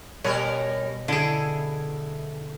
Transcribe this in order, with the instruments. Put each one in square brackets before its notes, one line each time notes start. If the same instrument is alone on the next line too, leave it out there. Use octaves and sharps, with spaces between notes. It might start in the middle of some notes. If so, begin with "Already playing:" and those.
[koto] B2 [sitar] G3 A#4 C#5
[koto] D3 G#4 [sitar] E4